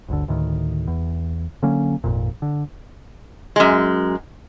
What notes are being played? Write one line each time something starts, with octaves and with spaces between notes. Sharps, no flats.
G1 D2 D3
D2 A2 D#3
E2
D3 F#3 A#3 C#4
G#1 F2 A#2
D3
F#2 G#3